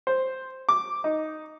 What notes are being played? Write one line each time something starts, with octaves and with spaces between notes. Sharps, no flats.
C5
D6
D#4